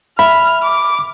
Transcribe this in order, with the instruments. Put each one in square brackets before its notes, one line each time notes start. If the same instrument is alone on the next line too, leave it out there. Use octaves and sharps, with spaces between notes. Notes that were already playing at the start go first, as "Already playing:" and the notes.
[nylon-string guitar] E5 [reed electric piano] B5 [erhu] F6
[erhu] D6